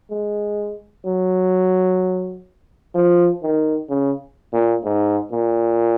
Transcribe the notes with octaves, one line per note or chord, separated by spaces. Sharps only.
G#3
F#3
F3
D#3
C#3
A#2
G#2
A#2